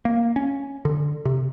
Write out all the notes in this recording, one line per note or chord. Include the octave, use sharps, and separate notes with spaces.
A#3
C#4
D3
C3